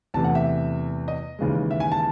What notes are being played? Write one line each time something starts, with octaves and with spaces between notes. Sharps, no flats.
E2 C3 E3 A3 A5
F#5
E5
D#5
D#2 C#3 E3 G#3
E5
G#5
A5